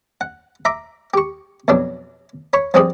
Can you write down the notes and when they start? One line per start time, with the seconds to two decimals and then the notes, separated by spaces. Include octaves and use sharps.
0.21 F#5
0.65 E5 A#5 D6
1.14 G4 C#6
1.68 F2 B2 F#3 D4
2.53 C#5 B5 C#6
2.74 G2 F3 C4 G#4 D5 D#6